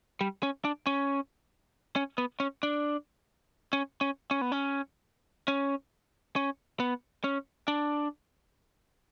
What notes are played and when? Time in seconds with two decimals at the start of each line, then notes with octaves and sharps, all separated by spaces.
0.21 G3
0.43 C#4
0.65 D4
0.87 C#4
1.96 C#4
2.18 B3
2.40 C#4
2.63 D4
3.73 C#4
4.01 C#4
4.31 C#4
4.41 B3
4.52 C#4
5.48 C#4
6.36 C#4
6.80 B3
7.24 C#4
7.68 D4